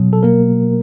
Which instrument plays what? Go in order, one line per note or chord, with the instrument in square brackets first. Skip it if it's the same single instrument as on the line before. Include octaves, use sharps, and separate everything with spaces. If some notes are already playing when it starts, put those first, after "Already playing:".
Already playing: [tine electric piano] B2 F#3
A4
A#3 A#4